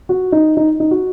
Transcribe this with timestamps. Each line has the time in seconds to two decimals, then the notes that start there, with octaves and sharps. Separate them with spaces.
0.09 F#4
0.32 D#4
0.57 D#4
0.80 D#4
0.91 F#4